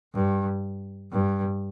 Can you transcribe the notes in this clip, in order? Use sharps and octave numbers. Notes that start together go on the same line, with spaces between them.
G2
G2